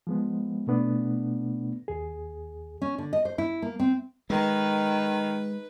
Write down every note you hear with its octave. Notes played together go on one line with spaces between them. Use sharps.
F3 G#3 B3
B2 A3 B3 D4
D#2 G#4
C#4
D3
D#5
C5
E4
A#3
C4
D#3 G#3 B4